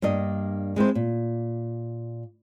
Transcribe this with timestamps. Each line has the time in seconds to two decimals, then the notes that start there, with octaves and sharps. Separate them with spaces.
0.02 G2 A#3 D4 D#5
0.76 G#3 C4 E4 C5
0.95 A#2